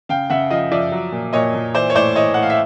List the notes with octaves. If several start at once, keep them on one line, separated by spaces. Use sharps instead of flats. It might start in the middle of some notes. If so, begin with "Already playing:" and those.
C#3 F5 G5
C#3 E5 F#5
F3 D#5 F5
F3 D5 E5
F#3
A#2
A#2 C#5 D#5
A#2
E3 C5 D5
C#5
A2 C5 D5
E3 C#5 D#5
A2 F#5
F5
E5